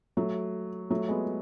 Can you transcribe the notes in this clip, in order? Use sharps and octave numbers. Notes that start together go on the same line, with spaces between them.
F#3 A3
F#3 A3
G#3 B3